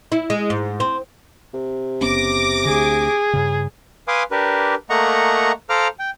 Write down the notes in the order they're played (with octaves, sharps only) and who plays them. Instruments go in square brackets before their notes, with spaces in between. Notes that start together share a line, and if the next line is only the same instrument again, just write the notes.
[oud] E4
G#3
G#2
C4
[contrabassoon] C3
[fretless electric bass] F#1 B3 C#4 [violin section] D6 A#6
[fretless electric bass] D2 D3 [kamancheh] G#4
[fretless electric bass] G2 C#3
[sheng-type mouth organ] B4 F5 G#5 C6 D6 D#6
D4 G4 A#4 B4
A3 A#3 D#5 F#5 A#5 C#6
A4 C5 F5 A#5 D6 F6
G5